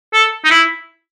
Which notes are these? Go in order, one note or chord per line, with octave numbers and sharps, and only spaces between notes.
A4
D#4
E4